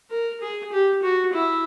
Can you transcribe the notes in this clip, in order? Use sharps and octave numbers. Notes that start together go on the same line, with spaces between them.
A#4
G#4
G4
F#4
E4